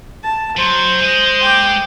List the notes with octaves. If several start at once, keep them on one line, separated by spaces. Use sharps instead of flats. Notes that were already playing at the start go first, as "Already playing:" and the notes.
A5
F#3 C5
G#3 D#5
G5 D6